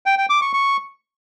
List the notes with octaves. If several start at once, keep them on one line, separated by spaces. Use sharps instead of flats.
G5
G5
D6
C#6
C#6